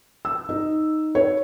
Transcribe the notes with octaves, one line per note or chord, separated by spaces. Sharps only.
E6
D#4
C#5